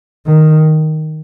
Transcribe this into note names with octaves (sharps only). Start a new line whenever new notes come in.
D#3